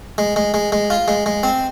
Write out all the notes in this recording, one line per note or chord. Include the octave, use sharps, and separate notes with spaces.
G#3
G#3
G#3
G#3
F4
G#3
G#3
C4